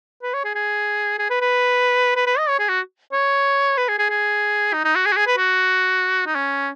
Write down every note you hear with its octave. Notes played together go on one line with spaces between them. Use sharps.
B4
C#5
G#4
G#4
G#4
B4
B4
B4
B4
D#5
C#5
G#4
F#4
C#5
B4
G#4
G#4
G#4
D#4
D#4
F#4
G#4
F#4
G#4
B4
F#4
D#4
C#4